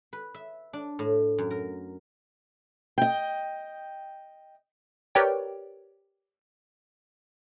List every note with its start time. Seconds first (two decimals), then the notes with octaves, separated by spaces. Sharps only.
0.13 B4
0.34 E5
0.73 D4
0.99 A2
1.38 F#2
1.51 A#4
2.98 D#5 G5
5.15 G4 A#4 B4 C#5 D5 G5